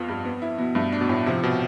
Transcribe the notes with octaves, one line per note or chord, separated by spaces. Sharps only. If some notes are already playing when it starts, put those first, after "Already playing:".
Already playing: F2 B3 F4
G2
B3
E4
B2
G2 A3
D4
B2
A2
C3 F3
B2